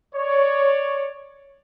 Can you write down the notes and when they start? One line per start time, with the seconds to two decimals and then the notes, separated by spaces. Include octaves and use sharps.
0.15 C#5 D5